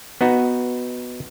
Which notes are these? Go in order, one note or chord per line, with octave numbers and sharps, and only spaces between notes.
B3 D#4 F#4